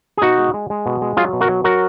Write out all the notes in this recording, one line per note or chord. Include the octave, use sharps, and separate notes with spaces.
G#4
B2 D#4 F#4
G#3
G#3
G#3
B2
G#3
F#3 F4 G#4
B2
F#4 A#4
F#3
F#3 F#4 A#4